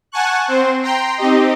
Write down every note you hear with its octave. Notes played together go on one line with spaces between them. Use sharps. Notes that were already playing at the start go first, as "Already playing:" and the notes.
F#5 G#5 A5 C#6 F#6
C4 C5
G5 A#5 C6
C4 D#4 G4 D#5